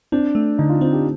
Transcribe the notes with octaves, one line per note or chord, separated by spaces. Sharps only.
C4 D4
A3
D3 D#4
F4
C4 F4
G4